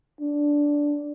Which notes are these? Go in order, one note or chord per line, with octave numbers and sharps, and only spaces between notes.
D4